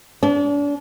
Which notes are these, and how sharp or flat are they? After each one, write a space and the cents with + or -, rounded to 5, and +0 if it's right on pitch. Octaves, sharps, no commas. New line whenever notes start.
D4 -35